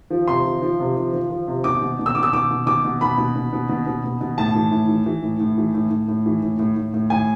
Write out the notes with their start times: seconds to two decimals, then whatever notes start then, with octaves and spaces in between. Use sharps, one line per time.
0.10 F3
0.28 C3 C6
0.45 F3
0.62 F3
0.80 C3
0.96 F3
1.13 F3
1.30 F3
1.48 C3
1.64 B2 D6
1.81 B2
1.99 B2
2.06 E6
2.15 B2 D6
2.23 E6
2.33 B2 D6
2.51 B2
2.66 B2 D6
2.85 B2
3.01 B2 B5
3.18 B2
3.36 B2
3.53 B2
3.69 B2
3.86 B2
4.04 B2
4.21 B2
4.38 A2 A5
4.55 E3
4.71 A2
4.89 E3
5.06 E3
5.22 A2
5.40 A2
5.58 E3
5.74 A2
5.91 A2
6.08 A2
6.26 E3
6.42 A2
6.59 A2
6.76 A2
6.94 A2
7.10 A2 G#5